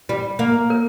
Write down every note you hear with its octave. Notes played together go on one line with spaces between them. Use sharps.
G3
A#3
A#4